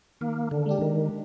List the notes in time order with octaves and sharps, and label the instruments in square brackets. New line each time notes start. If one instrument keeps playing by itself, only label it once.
[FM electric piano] D#3 [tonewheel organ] A#3
[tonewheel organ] D3
[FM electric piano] G#3 D4 G4
[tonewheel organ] D#3